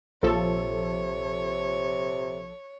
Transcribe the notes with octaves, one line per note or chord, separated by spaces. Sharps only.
A#1 C3 F3 A4 C#5